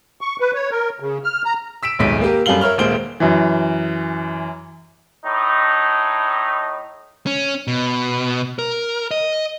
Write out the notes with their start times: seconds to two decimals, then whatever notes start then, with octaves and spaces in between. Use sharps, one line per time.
0.21 C#6
0.40 B4
0.54 C#5
0.71 A#4
1.00 C#3
1.24 F6
1.45 A#5
1.83 E6 B6 D7 E7
1.99 D#1 B1 G#2 B6 D7
2.21 A#3 G4 A#4
2.46 F#2 G3 A4 F5 F#7 G7
2.61 A#4 C#5 E5 F6
2.78 D#1 D#2 G#3 C5 D7 G7
3.20 F#2 E3
5.25 A2 D#4
7.27 C#4
7.67 B2
8.59 A#4
9.11 D#5